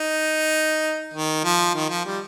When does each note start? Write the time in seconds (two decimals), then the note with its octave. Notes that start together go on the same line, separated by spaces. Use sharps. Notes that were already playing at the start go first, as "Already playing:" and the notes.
Already playing: D#4
1.14 D#3
1.44 F3
1.75 D#3
1.90 F3
2.05 G3